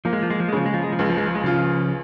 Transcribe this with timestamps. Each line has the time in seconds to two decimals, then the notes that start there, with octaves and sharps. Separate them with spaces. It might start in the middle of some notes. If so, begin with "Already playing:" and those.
0.05 F3 A#3
0.13 G#3
0.23 F3
0.30 G#3
0.40 F3
0.49 G#3
0.53 C#3 F3
0.66 G#3
0.74 F3
0.84 G#3
0.92 F3
0.99 C#2 G#3
1.09 F3
1.17 G#3
1.27 F3
1.35 G#3
1.44 C#3 F3 F4